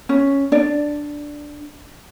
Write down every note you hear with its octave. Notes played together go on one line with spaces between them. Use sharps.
C#4
D4 D5